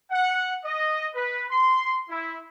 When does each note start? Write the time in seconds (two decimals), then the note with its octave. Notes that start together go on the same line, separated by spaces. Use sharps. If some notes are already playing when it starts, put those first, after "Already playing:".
0.10 F#5
0.64 D#5
1.14 B4
1.50 C6
2.09 E4